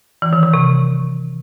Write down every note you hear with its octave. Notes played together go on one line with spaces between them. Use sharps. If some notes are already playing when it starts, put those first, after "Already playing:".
E3
D#3
D#3
C3